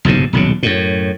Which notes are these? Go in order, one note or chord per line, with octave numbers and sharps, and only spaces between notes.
F#1 B1 G#2 C3
D#1 B1 C#3
F#2 A2